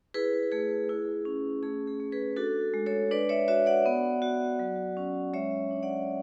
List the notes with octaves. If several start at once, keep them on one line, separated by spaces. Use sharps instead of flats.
E4 G#4 B4
A3 G#4
E4
C#4
A3 G#4
G#4
A3
G#4 B4
D4 F#4 A4
G#3
A4 C#5
D4 B4 D5
C#5 E5
F#4 C#5 E5
D5 F#5
B3
F#4
F#3
C#4
G#3 C#5 E5
D4
D5 F#5